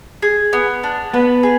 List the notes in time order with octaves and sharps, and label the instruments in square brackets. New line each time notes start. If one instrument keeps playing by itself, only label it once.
[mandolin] G#4
B3
D4
[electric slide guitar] B3 [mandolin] B4
[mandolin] G#4